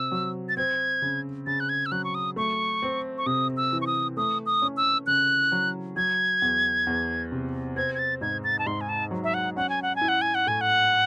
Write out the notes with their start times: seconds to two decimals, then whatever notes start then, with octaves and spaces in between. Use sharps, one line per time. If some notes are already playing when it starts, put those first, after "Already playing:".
Already playing: C3 E6
0.12 F#3
0.49 A6
0.57 C4 G#6
1.02 C#3
1.47 C#3 A6
1.60 F#6
1.69 G#6
1.86 E6
1.92 F#3 F#6
2.04 C#6
2.15 D#6
2.36 A3 C#6
2.82 C4
3.18 C#6
3.26 C3 D#6
3.57 E6
3.72 E3
3.82 C#6
3.87 D#6
4.17 A3 D#6
4.46 D#6
4.62 C#4
4.77 E6
5.07 C#3 F#6
5.52 F#3
5.96 F#3 G#6
6.42 E2
6.87 E2
7.32 C3
7.76 C4 G#6
7.95 G#6
7.99 A6
8.21 G#2 G#6
8.44 A6
8.59 A5
8.66 G#2 C6
8.81 G#5
8.89 A5
9.11 F#3
9.24 E5
9.34 F#5
9.56 C#4 F#5
9.69 G#5
9.82 F#5
9.96 G#5
10.01 E4
10.09 F#5
10.22 G#5
10.35 F#5
10.47 A2 G#5
10.61 F#5